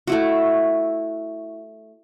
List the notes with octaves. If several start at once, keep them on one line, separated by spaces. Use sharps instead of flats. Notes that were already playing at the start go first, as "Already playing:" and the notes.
A3 E4 F#4